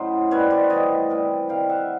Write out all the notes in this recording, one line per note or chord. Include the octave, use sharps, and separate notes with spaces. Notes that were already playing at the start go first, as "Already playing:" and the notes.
Already playing: A2 C#3 F#3 D#4 C5
B2 G3 B4 C#5
C5 D5
A2 E3 G3 C#5 D#5
C3 E3 G3
C3 D#3 G3 F5 G5
E5 F#5